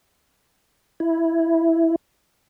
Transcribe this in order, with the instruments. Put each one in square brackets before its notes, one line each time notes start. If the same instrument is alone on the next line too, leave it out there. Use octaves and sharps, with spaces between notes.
[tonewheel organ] E4